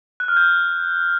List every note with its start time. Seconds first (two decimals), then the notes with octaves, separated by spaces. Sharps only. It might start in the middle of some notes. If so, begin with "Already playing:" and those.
0.20 F#6
0.28 F6
0.37 G6